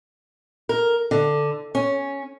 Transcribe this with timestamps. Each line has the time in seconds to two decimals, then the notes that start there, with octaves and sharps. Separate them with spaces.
0.69 A#4
1.11 D3
1.75 C#4